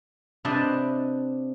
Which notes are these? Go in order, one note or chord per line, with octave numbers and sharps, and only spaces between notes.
C3 D4 B4 D#5 G5 A5